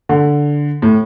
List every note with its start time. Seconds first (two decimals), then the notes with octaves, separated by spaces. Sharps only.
0.09 D3
0.82 A2